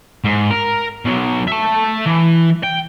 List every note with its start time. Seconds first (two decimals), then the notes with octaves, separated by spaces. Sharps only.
0.24 G#2
0.50 A#4
1.05 B2 F#3
1.48 E5 A5
2.06 E3
2.63 G5